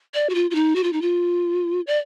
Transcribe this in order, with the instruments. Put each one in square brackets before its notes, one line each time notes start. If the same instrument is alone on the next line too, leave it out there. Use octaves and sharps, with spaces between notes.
[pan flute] D5
F#4
F4
F4
D#4
F#4
F4
D#4
F4
D5